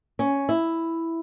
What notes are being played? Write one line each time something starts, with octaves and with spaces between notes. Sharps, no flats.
C#4
E4